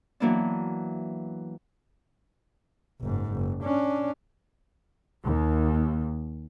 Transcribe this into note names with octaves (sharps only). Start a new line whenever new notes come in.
E3 F#3 A#3 B3 D4
F#1 G#2
F#1
C#4 D4
D#2